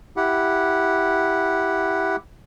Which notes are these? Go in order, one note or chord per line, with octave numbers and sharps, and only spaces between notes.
E4 G4 F#5